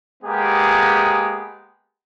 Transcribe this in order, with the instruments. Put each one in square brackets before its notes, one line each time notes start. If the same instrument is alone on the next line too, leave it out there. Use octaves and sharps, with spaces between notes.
[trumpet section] G#3 A#3 B3 G4 G#4